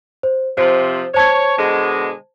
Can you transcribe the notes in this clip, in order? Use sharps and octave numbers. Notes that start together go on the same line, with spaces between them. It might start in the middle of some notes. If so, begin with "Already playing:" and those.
C5
C3 F3 C5
C5 C#5 A5 G#6
B2 D3 G#3